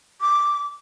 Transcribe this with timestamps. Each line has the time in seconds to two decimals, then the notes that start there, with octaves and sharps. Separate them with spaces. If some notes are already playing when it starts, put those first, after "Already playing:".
0.21 D6